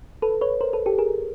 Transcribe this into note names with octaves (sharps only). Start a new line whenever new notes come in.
A4 B4
B4 C#5
A#4 C5
A4 B4
G4 A4
G#4 A#4